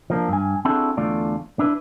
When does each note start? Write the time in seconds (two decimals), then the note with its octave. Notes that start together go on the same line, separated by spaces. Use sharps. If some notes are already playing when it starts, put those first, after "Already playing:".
0.10 F3 A#3 D4
0.28 G2 G#5
0.65 C4 D4 E4 F#4 G#4 A4
0.97 E2 D3 A3 F4 D5
1.59 D4 E4 B4